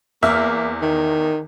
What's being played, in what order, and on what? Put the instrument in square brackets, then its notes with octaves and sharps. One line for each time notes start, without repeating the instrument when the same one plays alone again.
[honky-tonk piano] E2 E5 F6 [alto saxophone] A#3
[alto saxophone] D#3